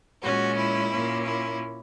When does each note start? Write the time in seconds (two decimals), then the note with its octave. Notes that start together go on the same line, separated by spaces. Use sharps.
0.22 A#2 G#3 C#4 F#4
0.56 E4
0.90 A#2 A#3 C#4
1.24 E4